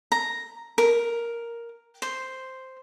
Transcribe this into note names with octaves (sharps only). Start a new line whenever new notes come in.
A#5
A#4
C5